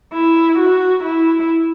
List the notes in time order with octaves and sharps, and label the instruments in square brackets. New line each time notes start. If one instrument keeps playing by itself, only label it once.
[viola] E4
F#4
E4